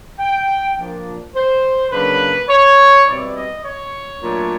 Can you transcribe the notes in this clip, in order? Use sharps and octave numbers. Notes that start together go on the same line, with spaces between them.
G5
A#2 F3 A#3 D4
C5
C#3 F#3 A#3 D4 B4
C#5
B2 G3 C4 E4 D5
D#5
C#5
A#2 F#3 A3 D4